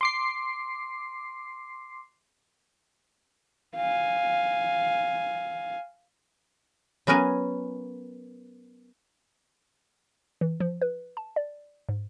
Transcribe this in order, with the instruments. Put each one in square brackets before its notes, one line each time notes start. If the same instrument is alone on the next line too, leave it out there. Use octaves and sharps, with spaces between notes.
[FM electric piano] C6 D6 C7
[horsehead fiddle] F5 G#5
[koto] F#3 B3 C#4 A#4 G#5
[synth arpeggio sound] E3
F3
B4
A5
D5
G#2